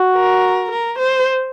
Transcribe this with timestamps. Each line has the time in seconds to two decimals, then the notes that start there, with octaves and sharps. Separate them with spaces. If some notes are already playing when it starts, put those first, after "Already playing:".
Already playing: F#4
0.14 A#4
0.71 A#4
0.99 C5